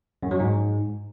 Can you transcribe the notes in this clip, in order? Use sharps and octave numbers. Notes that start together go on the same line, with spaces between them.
F#2
F#3
G#2